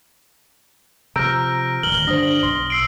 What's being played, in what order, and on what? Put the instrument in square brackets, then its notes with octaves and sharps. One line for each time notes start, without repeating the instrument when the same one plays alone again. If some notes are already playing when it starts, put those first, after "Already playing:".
[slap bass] C3 F3 [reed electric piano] A#5 E6 G6 [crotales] F6 A#6 D7
[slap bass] D1 D#3 [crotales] F6 F#7 G7
[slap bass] G2 D3 G3 [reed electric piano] D4 C5 [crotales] D#6 A#6
[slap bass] B1 [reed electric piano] C6
[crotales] E6 C7 D7